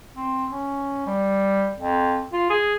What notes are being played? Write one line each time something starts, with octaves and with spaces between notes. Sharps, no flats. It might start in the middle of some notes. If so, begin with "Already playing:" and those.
C4
C#4
G3
F2
F4
G#4